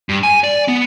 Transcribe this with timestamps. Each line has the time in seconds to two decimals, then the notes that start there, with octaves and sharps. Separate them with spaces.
0.09 G2
0.23 G#5
0.44 D5
0.68 B3